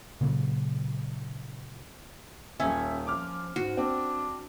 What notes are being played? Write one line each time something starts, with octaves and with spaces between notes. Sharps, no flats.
A#2 C#3 F#3
D#1 C#4 E5
F3 D6 F6
G#2 F#4
C4 D4